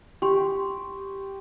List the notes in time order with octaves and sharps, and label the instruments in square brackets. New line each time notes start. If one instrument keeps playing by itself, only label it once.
[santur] G4 [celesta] C6 C#6